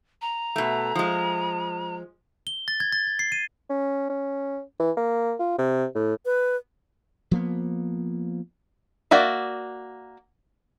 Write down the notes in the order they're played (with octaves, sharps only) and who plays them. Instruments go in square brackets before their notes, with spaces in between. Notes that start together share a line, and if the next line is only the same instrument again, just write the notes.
[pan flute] A#5
[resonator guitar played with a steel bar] B2 A3
F3 G#3
[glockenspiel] G7
A6
G#6
A6
G#6
C7
D#7
[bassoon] C#4
C#4
E3
A#3
F4
C3
A2
[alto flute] B4
[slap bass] F3 A#3 B3
[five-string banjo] A#3 F#4 D5 E5